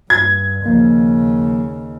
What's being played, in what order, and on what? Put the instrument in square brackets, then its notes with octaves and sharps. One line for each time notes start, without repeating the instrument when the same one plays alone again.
[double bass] G2 [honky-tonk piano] G#6
[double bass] D#2 C#3 [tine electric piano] F3 A#3